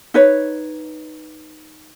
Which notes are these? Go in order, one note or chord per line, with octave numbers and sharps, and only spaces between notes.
D#4 B4 C#5